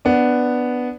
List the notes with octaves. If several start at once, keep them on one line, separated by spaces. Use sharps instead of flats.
B3 D4